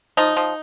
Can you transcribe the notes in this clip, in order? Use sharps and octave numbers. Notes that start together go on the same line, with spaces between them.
F3 D#4
F3